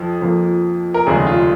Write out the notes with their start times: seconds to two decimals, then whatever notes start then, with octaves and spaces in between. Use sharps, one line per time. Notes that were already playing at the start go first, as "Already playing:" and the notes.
Already playing: F2 F3
0.22 F2 F3 A#3
0.94 A#4
1.07 F1 D#2 C#3 G#3 G#4
1.27 F4